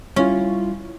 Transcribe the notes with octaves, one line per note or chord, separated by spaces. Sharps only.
G3 C#4 E4 F4